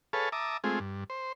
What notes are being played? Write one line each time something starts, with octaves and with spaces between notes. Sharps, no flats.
G#4 A4 B4 C#5 F5 A5
E5 A5 A#5 D6 D#6
G#3 A3 C4 F4 G#4
G2
C5